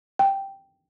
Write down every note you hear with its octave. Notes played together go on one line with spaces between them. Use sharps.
G5